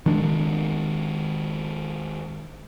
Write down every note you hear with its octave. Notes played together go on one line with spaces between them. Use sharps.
D#3 G#3 D4